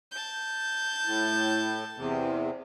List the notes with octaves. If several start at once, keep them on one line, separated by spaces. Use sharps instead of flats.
A5 G6
A2
E2 C3